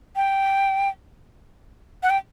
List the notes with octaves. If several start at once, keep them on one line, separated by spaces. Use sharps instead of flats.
G5
F#5
G5